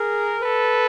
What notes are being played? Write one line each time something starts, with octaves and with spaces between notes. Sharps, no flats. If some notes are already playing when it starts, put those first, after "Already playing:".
Already playing: G#4 A#4
A4 B4